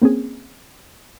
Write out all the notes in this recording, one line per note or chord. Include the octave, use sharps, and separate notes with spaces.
A#3 C4 C#4 G#4